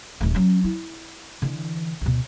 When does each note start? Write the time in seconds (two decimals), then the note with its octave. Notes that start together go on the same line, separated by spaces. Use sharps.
0.21 D#1 A3
0.35 F#3 C#4
0.64 E4
1.42 D3 E3
2.01 D2 B2